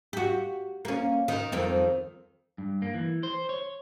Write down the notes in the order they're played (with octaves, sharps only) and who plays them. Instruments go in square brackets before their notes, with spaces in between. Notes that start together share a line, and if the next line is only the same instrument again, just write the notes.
[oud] F#4 G4
A#3 C#4
D#3
F2 D#3 C4
[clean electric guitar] G2
A#3
E3
C5
C#5